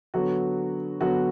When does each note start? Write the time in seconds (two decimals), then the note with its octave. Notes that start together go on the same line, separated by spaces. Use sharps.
0.14 D3 F#3 B3 F#4
1.01 D3 F#3 B3 F#4